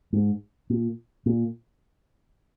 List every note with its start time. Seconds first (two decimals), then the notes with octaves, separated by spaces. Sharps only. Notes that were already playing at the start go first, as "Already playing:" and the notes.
0.13 G#2
0.70 A#2
1.26 A#2